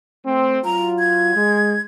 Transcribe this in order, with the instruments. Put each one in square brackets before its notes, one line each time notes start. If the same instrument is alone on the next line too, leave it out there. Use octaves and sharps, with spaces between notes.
[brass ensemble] A3 C4
[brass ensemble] F#3 F4 [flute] A#5
[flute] G#6
[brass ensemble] G#3